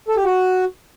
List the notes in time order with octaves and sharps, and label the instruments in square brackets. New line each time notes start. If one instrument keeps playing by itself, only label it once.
[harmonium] A4
G4
F#4